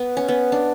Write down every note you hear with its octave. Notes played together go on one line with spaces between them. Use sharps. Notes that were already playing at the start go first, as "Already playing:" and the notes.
Already playing: B3
C#4
B3
D4